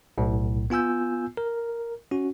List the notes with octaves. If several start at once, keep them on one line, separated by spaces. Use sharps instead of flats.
B1 A2
B3 F4 G#5 E6 G6
A#4
C#4 F#4